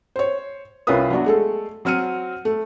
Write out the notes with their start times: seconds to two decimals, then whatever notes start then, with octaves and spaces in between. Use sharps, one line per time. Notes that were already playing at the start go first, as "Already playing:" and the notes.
0.16 C5 C#5
0.87 C2 C#4 F4 A#4 B4 D#6
1.10 F#3 B3 D4 F#4
1.26 G#3 A3 A4
1.85 F#3 C4 F6 C#7 D#7
2.45 A3